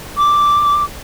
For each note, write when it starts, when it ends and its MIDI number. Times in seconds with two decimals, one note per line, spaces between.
0.17 0.82 86